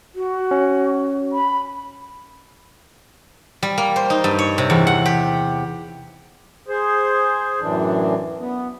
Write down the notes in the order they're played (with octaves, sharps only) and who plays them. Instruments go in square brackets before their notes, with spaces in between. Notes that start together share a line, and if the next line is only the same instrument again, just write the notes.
[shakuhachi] F#4
[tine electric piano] C#4
[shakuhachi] B5
[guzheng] G3
A#3
C5
D#4
G2
C#5
C3
E2
F#5
G4
[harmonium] G#4 C5
F#2 A2 E3 D4
B3